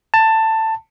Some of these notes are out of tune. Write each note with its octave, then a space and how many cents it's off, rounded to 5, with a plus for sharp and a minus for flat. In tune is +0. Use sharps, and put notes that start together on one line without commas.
A5 +15